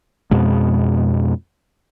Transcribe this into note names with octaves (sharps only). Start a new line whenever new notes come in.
F2 B2 G#3